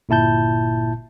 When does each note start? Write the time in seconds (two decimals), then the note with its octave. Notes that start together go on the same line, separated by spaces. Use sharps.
0.09 G1 A#2 E4 A5 G6